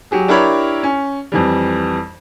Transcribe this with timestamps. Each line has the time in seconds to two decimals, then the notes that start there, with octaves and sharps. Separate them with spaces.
0.11 F#3 G4 G#4
0.28 D4 E4 G4 A#4 C#5 B5
0.84 C#4
1.32 F2 E3 G3